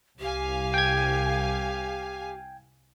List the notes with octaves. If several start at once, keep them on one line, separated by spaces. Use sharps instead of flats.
C2 G4 F5 G#5
G5 G#6